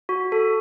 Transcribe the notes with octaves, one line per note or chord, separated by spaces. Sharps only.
F#4
A4